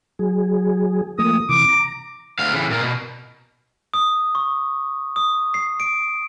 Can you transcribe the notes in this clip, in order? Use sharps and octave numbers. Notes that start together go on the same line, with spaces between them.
F#3 G#4
F3 A3 A#3 D#6
C3 E3 D6
A#5
D2 F5
C#3 E3
A#2 A#3
B2
D#6
C#6
D#6
C7
D7